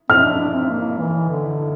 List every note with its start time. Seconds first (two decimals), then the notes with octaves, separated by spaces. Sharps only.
0.10 C4 F6
0.24 D4
0.39 D4
0.54 C4
0.69 A#3
0.99 E3
1.29 D3